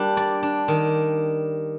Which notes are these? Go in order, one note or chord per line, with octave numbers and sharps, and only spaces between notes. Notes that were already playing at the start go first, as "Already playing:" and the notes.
Already playing: G3 A#3 D4
D5
D4
D#3